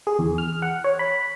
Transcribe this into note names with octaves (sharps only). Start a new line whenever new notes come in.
G#4
E2
F6
F#5
C#5
B5